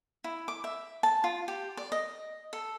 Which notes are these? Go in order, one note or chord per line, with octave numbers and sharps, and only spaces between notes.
E4
D6
E5
A5
F4
G4
D5
D#5
A4